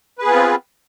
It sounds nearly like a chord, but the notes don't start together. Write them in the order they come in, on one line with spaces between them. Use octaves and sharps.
B4 G#4 B3 F4 C4